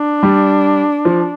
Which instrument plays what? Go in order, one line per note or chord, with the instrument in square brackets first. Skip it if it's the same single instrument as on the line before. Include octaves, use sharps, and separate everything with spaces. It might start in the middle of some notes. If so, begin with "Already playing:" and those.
Already playing: [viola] D4
[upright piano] G3
F3